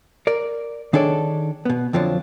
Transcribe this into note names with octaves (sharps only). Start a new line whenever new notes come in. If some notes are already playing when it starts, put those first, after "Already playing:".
A#4 D5
D#3 D4 G#4 A4 C#5 D5
B2 B3
F2 D3 F3 F#3 D4